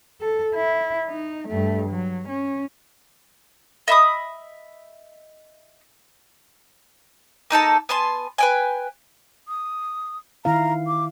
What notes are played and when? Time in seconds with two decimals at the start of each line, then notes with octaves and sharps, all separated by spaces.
0.21 A4
0.55 E4
1.08 D#4
1.48 G2 A3
1.90 F#3
2.28 C#4
3.88 D#5 E5 B5 D#6
7.50 A#3 D#4 A4 A5
7.89 B3 G#5 A5 C6
8.38 B4 G5 G#5
9.48 D#6
10.45 D#3 E4 F5 A#5
10.87 D6